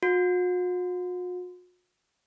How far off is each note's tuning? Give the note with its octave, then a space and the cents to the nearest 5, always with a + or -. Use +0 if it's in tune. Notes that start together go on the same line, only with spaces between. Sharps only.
F#4 -45